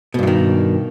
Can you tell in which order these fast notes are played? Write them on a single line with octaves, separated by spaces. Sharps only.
B2 G2 E3 D#3